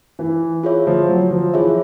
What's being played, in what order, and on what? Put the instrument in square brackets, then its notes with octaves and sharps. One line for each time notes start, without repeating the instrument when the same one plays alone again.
[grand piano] E3
[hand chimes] F4 G#4 C#5 E5
[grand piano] F3
F#3
F3
[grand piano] E3 [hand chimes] F4 G#4 C#5 E5